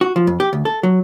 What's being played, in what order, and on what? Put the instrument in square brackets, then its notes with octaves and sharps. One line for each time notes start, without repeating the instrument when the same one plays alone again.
[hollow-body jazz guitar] F#4
F3
F2
G4
D2
A4
F#3